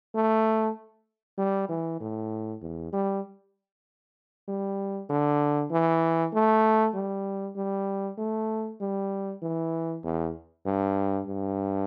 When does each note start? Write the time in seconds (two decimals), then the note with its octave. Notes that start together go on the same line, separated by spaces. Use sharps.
0.15 A3
1.38 G3
1.69 E3
2.01 A2
2.62 E2
2.93 G3
4.48 G3
5.10 D3
5.71 E3
6.33 A3
6.95 G3
7.56 G3
8.18 A3
8.81 G3
9.42 E3
10.03 E2
10.66 G2
11.27 G2